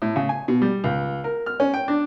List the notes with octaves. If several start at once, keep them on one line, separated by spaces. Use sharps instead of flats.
A2
C#3
G#5
B2
G3
C#2
A#4
F6
C#4
G5
D4